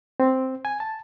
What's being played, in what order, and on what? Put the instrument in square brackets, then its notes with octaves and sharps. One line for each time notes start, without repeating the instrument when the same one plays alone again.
[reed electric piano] C4
G#5
A5